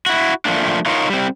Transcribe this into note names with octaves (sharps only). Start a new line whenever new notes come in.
E4 F#4
F3 A3 A#3 D4
D#4 F4 A#4 C#5
G3 C4